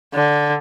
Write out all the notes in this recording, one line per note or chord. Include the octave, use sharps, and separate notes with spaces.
D3